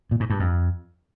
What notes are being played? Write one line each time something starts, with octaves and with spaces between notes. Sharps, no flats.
A#2
G#2
G2
F2